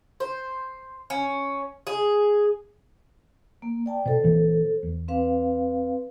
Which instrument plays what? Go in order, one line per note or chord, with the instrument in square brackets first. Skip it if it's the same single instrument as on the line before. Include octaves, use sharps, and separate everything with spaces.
[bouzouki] C5
C#4
G#4
[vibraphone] A#3
D5 G5 A5
[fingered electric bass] B2 [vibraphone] A4 C5
[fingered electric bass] C#2 A#2 E3
E2
[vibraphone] C4 B4 F5